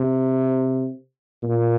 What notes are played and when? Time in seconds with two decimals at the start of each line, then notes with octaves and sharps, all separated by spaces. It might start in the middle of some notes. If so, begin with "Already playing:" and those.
Already playing: C3
1.43 A#2